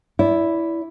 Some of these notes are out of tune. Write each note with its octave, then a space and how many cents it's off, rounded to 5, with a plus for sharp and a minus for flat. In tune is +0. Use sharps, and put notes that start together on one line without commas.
E4 +0 D5 -30